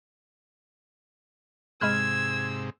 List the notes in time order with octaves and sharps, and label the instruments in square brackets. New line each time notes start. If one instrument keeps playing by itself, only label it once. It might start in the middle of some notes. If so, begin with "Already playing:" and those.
[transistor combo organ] G#2 C3 [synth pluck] G#3 B5 F6 [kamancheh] E6 [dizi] G#6